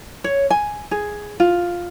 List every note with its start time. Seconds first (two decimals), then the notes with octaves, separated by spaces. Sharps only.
0.24 C#5
0.50 G#5
0.91 G#4
1.40 F4